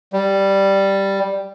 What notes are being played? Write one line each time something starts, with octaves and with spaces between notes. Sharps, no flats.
G3